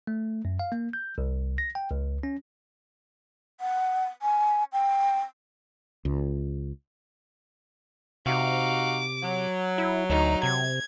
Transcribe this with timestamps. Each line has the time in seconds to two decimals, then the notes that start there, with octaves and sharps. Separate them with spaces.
0.07 A3
0.45 F#2
0.59 F5
0.72 A#3
0.93 G6
1.18 C2
1.58 A#6
1.75 G5
1.91 C#2
2.23 C#4
3.60 F#5
4.22 G#5
4.73 G5
6.05 C#2
8.26 C3 D#4 F#4 F5 D6
9.22 F#3
9.78 E4
10.10 D2 D#4
10.43 C3 G#6